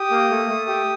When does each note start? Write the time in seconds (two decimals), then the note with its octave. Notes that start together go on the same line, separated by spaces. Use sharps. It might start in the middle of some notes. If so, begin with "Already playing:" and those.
Already playing: G4 D#6
0.11 A#3
0.30 A3
0.49 A3
0.67 G4